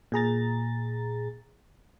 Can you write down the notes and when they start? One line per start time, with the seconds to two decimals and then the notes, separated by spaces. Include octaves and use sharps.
0.12 A#2 G#4 A#5 A6